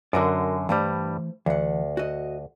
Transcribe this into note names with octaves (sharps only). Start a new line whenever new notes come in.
F#2 D3 F#4 A#4 D5
G2 E3 G3 A3 C5
D2 E3 F#5
F#4 D#5